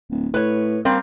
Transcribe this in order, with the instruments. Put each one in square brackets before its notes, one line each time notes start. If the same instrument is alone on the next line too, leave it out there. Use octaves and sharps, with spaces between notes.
[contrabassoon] D1
[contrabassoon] A2 [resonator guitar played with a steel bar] B4 C#5
[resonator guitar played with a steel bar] G3 A#3 C4